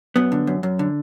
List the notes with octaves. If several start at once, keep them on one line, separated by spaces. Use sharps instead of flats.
F#2 B3
D3
F#2
F#2
D3